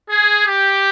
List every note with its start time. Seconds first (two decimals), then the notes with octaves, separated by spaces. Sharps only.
0.09 G#4
0.46 G4